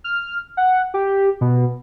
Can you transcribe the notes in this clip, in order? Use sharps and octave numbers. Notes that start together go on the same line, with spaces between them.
F6
F#5
G4
B2